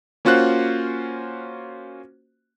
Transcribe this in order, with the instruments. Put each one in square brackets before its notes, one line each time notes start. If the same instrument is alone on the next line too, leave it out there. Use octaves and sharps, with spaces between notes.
[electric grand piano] A#3 C#4 F4 F#4 C5 F#6